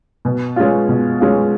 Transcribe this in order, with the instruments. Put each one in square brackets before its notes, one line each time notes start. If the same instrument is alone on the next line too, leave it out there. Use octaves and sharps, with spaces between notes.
[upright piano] B2
G#3 C#4 F4
B2
G#3 C#4 F4